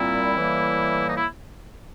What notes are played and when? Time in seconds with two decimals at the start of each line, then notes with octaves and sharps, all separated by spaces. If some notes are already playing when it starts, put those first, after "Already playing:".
Already playing: A#2 G3 C4 E4
0.36 A2 E3 G3 A#3
1.09 D#4
1.18 E4